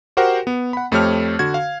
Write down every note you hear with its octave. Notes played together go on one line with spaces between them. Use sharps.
F#4 G4 A#4 C5 F#5 G5
B3
F#5 B5
F2 A3 C4 G4 C#5 F6
D3 F#4 G#6
F5